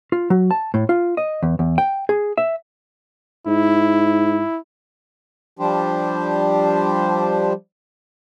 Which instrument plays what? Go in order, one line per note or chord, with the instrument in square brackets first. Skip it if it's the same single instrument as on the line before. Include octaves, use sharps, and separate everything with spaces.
[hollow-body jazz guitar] F4
F#3
A5
A2
F4
D#5
E2
E2
G5
G#4
E5
[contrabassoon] G#2 [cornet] E4
[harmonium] F3 G3 D4 G4 C5